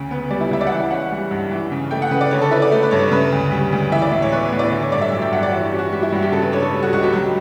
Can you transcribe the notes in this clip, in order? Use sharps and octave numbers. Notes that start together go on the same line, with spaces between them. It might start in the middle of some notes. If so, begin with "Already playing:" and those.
Already playing: D2 C#3
B3
G3 D5
E4
C#2 E5
D5
F#5
E3 E5
C#4 F#5
G3
G2
E3
C#3
A3 G5
F#5
C#3 B4
D5
D3 C#5
A4
E4 B4
D5
A3
B4
G2 C#5
C#3 B4
D2
G3
D2
E3 E5
D5
A2 E5
C#5
B3 B4
C#5
A2
D5
D3 D5
C#5
G2 D5
E5
F#3 E5
G5
G2 F#5
E5
D5
E3 F#4
G4
C#4
F#4
G3 G4
E4
G2 F#4
G4
C#3 A4
B4
D4 C#5
A4
G3
F#4
C#2 F#4
G4
F#3